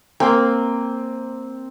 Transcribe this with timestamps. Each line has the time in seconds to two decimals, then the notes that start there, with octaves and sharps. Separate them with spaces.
0.20 A#3 C4 G5 G#5